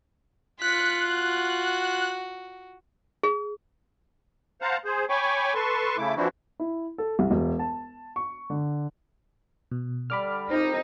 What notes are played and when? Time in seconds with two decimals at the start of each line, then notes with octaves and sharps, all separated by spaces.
0.62 F4 F#6 B6 C#7
1.09 F#4
3.23 G#4
4.62 C5 F5 F#5 A5 A#5
4.85 G#4 C5
5.09 C#5 G5 G#5 B5 C#6 D6
5.54 A4 B4 A5 C6 C#6
5.98 C#3 A3 E4 D6
6.16 E3 F3 C4 D4 E4 F#4
6.60 E4
6.98 A4
7.19 C2
7.31 E1
7.59 A5
8.16 C#6
8.50 D3
9.71 B2
10.10 D3 G3 B5 D6 F6
10.50 C2 F2 C4 D#4 C5